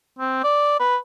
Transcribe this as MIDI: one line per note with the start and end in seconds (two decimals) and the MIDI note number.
0.19 0.41 60
0.44 0.77 74
0.80 0.96 71